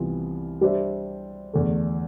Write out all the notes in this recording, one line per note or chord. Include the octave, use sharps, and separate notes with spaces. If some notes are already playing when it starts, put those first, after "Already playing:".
Already playing: C2 C3 E3 B3 F4
G3 D4 G4 C5 E5
E2 D3 A3